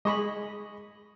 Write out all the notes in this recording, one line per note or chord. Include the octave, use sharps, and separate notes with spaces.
G#3 G#4 D#5 B5 C#6